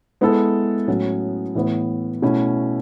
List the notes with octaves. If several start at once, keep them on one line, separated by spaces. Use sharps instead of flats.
G#3 B3 E4 A4
A2 F#3 C#4
A2 E3 B3
B2 A3 C#4 E4